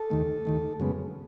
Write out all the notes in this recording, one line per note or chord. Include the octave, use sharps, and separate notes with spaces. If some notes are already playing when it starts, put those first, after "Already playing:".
Already playing: A4
D#2 D#3 A3
D#2 D#3 A3
F#2 C#3 G#3 B3